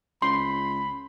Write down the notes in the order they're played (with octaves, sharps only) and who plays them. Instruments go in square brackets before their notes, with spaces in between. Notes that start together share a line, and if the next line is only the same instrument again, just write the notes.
[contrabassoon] C#2 [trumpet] B5 [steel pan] C6